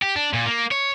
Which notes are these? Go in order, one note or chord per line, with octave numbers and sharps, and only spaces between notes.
G4
D4
A#2
A#3
C#5